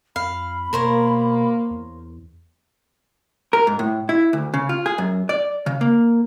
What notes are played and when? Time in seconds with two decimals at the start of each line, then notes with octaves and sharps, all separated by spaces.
0.16 F2 F5 B5
0.73 B2 A#3 A#4 C5 C#5
1.71 E2
3.53 A#4
3.67 G#2
3.79 A2
4.09 E4
4.33 D2
4.54 C#3
4.69 F4
4.86 G#4
4.98 F#2
5.29 D5
5.66 C#3
5.81 A#3